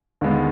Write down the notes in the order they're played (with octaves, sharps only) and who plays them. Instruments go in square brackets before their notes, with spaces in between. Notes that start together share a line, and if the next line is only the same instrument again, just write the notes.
[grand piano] D#2 D3 G#3 B3